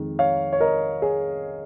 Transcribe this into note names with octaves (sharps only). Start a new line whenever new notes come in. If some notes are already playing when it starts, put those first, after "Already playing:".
Already playing: F2 D#3 G#3
C#5 F5
C#5
A#4 D#5
G#4 C#5